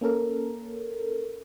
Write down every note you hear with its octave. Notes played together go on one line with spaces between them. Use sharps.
A#3 C#4 A4 A#4